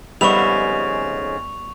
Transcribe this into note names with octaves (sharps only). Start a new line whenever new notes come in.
F2 G#2 C#3 G3 B3 E5 C#6 F7